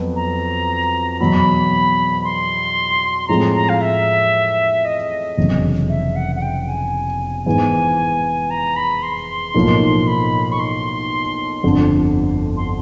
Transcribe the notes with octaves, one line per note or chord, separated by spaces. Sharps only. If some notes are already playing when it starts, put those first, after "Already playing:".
Already playing: F2 F#3 B3
A#5
E2 B2 F#3 B5
C6
A2 F3 G#3 C4 A#5
A#5
F5
E5
D#5
F1 E2 C#3 F#3
E5
F#5
F#5
G5
G#5
G#2 E3 G#3 B3 G#5
A#5
B5
C6
B1 A2 F3 A#3 D#4
B5
C#6
C6
G1 F2 D3
C6